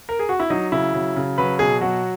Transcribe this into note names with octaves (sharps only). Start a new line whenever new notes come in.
A#4
G#4
F#4
E4
F#3 D#4
C#3 E4
F#3
C#3
F#3 B4
B2 G#4
F#3 F#4